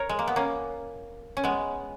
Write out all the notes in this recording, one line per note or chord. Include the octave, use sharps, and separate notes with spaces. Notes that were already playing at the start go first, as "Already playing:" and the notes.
Already playing: A#4 C#5
G#3
A#3
B3
A#3 C#4
C#4
G#3 B3